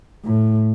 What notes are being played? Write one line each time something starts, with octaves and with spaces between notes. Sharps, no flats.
A2